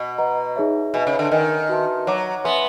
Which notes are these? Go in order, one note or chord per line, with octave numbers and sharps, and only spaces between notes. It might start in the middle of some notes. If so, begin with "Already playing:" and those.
Already playing: B2
B4 D#5 F#5 A#5
D#4 G#4 C#5 E5
B2 B4 E5 G#5
C#3
D3
D#3 A#4 D#5 G#5
F#4 B4 E5 A5 C6
F#3 C#5 F#5 A#5 D6
B3 B4 E5 G#5 C6